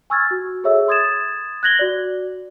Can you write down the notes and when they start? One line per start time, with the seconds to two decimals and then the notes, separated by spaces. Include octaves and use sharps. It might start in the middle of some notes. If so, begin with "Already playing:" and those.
0.10 G#5 C#6 E6 F6 G#6 A6
0.31 F#4
0.64 G#4 A4 C#5 E5 E6
0.88 C6 D#6 G#6 A6 E7
1.63 F#6 G#6 A#6 F#7 G7
1.79 F#4 D5